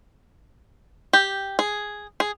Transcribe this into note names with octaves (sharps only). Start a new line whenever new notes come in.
G4
G#4
G#4